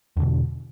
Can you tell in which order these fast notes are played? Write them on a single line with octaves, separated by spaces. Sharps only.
E2 D3 B2